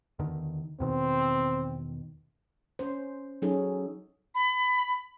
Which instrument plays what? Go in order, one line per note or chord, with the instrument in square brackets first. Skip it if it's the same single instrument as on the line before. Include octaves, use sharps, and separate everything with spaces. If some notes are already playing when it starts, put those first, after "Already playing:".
[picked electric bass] E2 D3 D#3
[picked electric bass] E2 B2 D#3 [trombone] C4
[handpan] C#4 C5
F#3 C#4 D#4 G#4 A4
[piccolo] B5